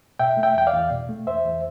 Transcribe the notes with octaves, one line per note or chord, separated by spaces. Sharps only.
B2 E5 G5
A3
E5 G5
E2 G5
D5 F5
E2
B2
A3
E2 C5 E5
E2